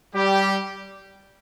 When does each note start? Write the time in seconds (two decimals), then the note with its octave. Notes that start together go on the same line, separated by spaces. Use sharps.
0.14 G3 G4